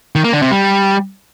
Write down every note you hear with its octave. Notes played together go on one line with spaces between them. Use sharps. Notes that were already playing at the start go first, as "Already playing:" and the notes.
D#3
A#3
D3
C3
G3